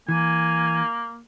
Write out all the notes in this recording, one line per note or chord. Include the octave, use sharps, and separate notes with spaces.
E3 A#3 G#5